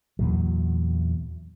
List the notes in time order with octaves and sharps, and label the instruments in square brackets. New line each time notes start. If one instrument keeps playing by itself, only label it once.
[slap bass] E2 A#2 F#3